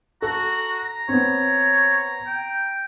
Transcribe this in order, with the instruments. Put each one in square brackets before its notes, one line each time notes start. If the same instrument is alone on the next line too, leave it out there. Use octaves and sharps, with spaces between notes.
[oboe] F#4 [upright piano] A4 [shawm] A#5
[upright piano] B3 C4 [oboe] C#5
[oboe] G5